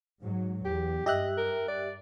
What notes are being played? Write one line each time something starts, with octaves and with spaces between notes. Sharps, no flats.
G#2 F#3
E2 G4
G2 G4 D#5 E5 F#6
A#4
D5